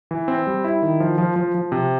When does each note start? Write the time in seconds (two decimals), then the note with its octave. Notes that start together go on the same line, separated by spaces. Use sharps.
0.11 E3
0.28 C4
0.47 G3
0.64 E4
0.82 D#3
1.00 F3
1.18 F3
1.36 F3
1.55 F3
1.72 C3